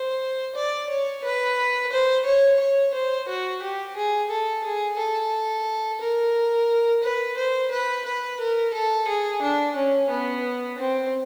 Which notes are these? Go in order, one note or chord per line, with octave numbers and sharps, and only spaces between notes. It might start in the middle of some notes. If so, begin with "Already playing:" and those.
Already playing: C5
D5
C#5
B4
C5
C#5
C#5
C5
F#4
G4
G#4
A4
G#4
A4
A#4
B4
C5
B4
B4
A#4
A4
G#4
D4
C#4
B3
C4